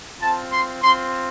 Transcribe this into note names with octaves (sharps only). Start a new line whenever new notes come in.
C4 F4 A5
C6
C4 F4 C6